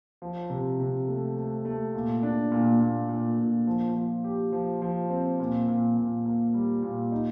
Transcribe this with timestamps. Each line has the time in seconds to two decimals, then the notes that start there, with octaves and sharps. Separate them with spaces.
0.22 F3
0.50 C3
0.80 C3
1.08 A3
1.37 A3
1.65 A3
1.94 A#2
2.23 D4
2.52 A#2
2.80 A#2
3.09 A#2
3.39 A#2
3.67 F3
3.95 F3
4.24 G4
4.52 F3
4.82 F3
5.10 C4
5.40 A#2
5.68 A#2
5.97 A#2
6.25 A#3
6.54 G3
6.83 A#2
7.12 D#4